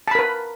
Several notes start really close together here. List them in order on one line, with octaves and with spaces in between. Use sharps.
A5 B5 A#4 B4